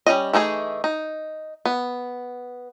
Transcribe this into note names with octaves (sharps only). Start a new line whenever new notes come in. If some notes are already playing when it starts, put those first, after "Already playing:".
G3 C#4 F#4 D#5
E3 A3 D#4 G#4
D#4
B3